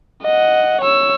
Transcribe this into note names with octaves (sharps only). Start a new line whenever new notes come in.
D#5 F#5
C#5 E6